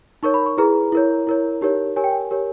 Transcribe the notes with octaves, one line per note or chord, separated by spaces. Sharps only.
D#4 A#4 C#5 C#6
B5
C#6
E4 G#4 B4 A#5
E4 A#4 C#5
E4 A#4 C#5
D#4 G4 A#4 C#5
G4 A#4 C#5 G#5
G5
G#5
G4 A#4 C#5